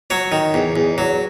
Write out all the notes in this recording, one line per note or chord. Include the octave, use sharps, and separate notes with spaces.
F#3 C#5
D#3
E2
E2
F#3